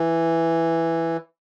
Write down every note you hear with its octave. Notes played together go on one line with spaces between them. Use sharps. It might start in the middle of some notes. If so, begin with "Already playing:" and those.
Already playing: E3